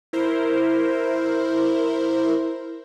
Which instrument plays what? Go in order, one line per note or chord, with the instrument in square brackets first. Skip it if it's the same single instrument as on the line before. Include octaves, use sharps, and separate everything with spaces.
[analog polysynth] E4 A#4 C5